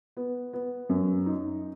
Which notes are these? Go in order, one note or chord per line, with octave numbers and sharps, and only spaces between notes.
B3
B3
F#2
D#4